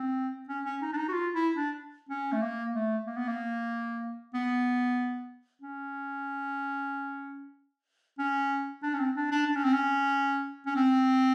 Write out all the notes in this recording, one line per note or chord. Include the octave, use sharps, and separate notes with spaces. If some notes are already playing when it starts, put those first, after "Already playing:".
Already playing: C4
C#4
C#4
D#4
D4
D#4
F#4
F4
E4
D4
C#4
A3
A#3
A3
A#3
B3
A#3
B3
C#4
C#4
D4
C#4
C4
D4
D4
D4
C#4
C4
C#4
C#4
C4